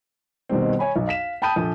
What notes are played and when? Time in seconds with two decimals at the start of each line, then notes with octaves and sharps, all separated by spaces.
0.49 B2 D#3 G3 C4
0.79 C#5 G#5 B5
0.96 B1
1.07 F5 B6 E7
1.42 G5 A5 B5 D#6 G6 D#7
1.56 A#1 A4